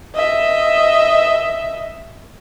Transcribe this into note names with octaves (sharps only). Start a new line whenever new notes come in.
D#5 E5